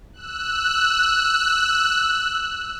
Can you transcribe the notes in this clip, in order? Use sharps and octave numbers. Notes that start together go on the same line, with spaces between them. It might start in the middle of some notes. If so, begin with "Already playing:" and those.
E6 F#6